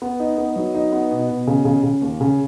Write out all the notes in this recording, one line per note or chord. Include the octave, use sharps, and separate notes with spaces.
B3
D#4
B3
F#3
D#4
B3
B2
B2
C#3
C#3
C#3
D#2
C#3